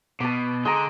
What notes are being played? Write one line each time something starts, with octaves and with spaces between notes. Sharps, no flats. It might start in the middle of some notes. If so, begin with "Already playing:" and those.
B2 A5 D6
D3 G#3 A#5